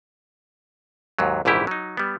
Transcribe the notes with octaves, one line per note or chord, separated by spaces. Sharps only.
D#2 G#2 F#3
A#1 G#2 C#3 E3 E4 G4
F#3 D#4
G3 B3